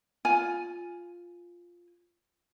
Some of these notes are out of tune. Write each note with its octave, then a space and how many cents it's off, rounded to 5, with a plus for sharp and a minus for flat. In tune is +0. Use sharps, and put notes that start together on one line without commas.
F4 +0 G#5 +0